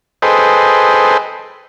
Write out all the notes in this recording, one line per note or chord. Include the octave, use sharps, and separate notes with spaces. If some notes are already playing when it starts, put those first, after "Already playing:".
G#4 A4 B4 C5 D#5 G5